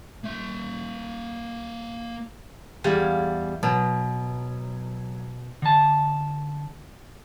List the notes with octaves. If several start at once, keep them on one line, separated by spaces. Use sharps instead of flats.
A#3 E5
E2 G3 F5 G#5
B2 F#3
D3 A5